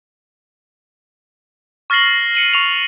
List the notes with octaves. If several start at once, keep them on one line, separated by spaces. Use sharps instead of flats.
C#6 F6 A6 A#6 C7 F#7
C#7 D#7 F#7
C#6 F7